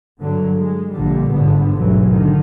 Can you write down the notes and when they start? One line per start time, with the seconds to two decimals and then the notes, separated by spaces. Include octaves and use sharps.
0.21 G2 D3 F#3
0.58 G#3
0.93 A#1 A#2 D3 G3
1.32 G1 G#2 D3 B3
1.75 A1 D2 G#2 B2 E3 F#3
2.11 D3 D#3